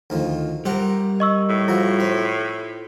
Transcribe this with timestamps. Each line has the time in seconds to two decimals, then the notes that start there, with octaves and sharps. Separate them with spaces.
0.10 D2 D#3 F3
0.65 G3 G4 A#4 C5 F#5
1.20 D#5 C#6 E6
1.49 A2
1.68 F3 F4 F#4
2.00 C4